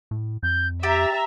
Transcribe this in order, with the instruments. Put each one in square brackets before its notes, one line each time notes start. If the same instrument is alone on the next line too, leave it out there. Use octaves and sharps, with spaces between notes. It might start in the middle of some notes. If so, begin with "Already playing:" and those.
[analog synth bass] A2
[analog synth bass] F2 [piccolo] G6
[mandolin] G4 [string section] E5 A#5 [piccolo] A6